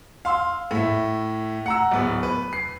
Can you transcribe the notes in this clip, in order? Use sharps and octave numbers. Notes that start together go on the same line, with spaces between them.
F5 C6 E6
A2 E5
F#5 A#5 E6
D1 B3
B4
C7